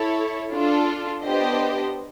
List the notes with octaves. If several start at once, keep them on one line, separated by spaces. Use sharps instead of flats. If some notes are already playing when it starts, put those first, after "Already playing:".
Already playing: E4 A4 C#5
D4 F4 A4
B3 D4 G4 C5 D#5